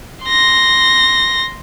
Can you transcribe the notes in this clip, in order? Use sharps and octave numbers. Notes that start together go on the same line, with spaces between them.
C6 A#6